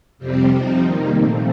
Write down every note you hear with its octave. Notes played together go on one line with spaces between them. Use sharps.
F2 C3 G3 C4
C3 F3 C4 D#4
D#3 G3 A#3 D#4
A#2 F3 A3 C4